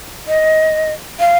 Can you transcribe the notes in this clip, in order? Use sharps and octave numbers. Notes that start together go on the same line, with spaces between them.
D#5
F5